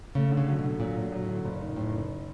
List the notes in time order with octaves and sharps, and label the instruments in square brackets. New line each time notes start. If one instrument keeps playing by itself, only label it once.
[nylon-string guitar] C#3 [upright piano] A3
[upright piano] D3
[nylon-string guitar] C#3
[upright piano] F#3
[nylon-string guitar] B2
[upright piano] D3
[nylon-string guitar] B2
[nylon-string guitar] A#2 [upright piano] F#3
[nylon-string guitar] A#2 [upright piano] F#3
[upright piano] F#3
[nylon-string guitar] A2
[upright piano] D3
[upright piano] F#1 [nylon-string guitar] A#2
[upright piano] D#3
[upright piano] F#1 [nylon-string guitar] A2
[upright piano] F#1